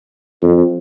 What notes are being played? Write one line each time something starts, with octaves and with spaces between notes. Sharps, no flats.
F2